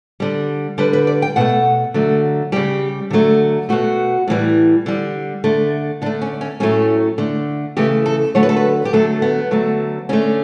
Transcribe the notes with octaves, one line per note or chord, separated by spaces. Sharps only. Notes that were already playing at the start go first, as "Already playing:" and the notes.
D3 G3
D3 G3 B4
B4
D5
G5
B2 A3 F#5
D3 F#3 A3
C#3 G3 G4
D3 F#3 A3
B2 A3 F#4
A2 E3 G3
D3 G3
D3 A3
D3 A3 D4
C#4
C#4
A2 F#3 A3 C#4
D3 A3
C#3 E3 A3 G4
A4
D3 F#3 A3 C#5
B4
A4
B4
G4
D3 F#3 A3 A4
B3
D3 F#3 A3
D3 A3 C#4